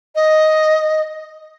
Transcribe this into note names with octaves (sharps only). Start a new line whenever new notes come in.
D#5